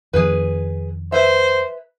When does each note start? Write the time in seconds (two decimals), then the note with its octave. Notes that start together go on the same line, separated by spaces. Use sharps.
0.13 F2 D#3 F3 G#4 B4
1.12 B4 C5 E5